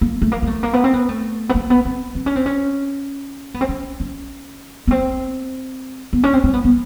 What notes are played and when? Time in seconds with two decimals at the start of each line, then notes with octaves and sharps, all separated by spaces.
0.01 A#3
0.22 A3
0.32 A#3
0.42 A#3
0.47 A3
0.63 A#3
0.73 B3
0.84 C4
0.94 B3
1.09 A3
1.49 B3
1.55 A#3
1.70 B3
1.85 C4
2.15 C4
2.26 C#4
2.36 C4
2.46 C#4
3.54 B3
3.61 C4
3.69 C#4
4.00 C#4
4.87 B3
4.91 C4
6.13 B3
6.24 C#4
6.33 C4
6.44 C4
6.53 B3
6.64 B3